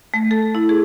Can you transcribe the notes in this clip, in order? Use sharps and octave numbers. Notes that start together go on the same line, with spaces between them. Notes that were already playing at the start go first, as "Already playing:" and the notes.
A3
A4
E4
G#4